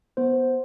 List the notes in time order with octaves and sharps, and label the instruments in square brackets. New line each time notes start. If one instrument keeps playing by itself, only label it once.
[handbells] B3 C5